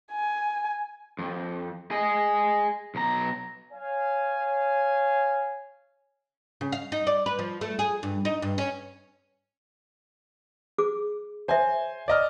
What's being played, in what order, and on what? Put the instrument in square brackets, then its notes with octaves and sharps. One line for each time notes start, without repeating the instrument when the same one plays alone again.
[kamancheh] G#5
[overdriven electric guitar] F2
G#4 D#5
B1 A#5
[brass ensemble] C#5 F5 G#5
[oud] C#3
F5
D#4
D5
B4
F3
A3
G#4
G2
D#4
G2
C#4
[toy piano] G#4 D6
[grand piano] C5 G#5 [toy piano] C#5 E5
[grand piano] D5 D#5 F6